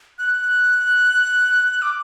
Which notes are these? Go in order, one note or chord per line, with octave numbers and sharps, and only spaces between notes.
F#6
D6